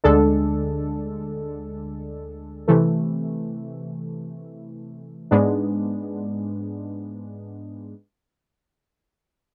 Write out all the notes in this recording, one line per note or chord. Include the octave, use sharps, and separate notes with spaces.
D2 D3 G#3 D4 A4
C3 E3 A3
G#2 G#3 B3 D4